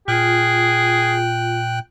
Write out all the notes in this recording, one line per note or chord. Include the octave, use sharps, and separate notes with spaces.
A#2 F4 G#4 G5 F#6